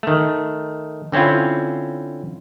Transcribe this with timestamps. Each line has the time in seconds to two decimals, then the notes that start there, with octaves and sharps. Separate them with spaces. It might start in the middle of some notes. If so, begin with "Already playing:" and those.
0.03 D#3 A3
1.12 D3 C4 C#4 E4 F4